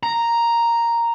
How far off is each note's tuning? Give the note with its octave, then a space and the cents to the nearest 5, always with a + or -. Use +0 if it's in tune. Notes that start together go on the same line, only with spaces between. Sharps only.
A#5 +0